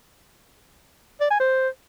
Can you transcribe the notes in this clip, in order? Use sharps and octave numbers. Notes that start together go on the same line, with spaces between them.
D5
G#5
C5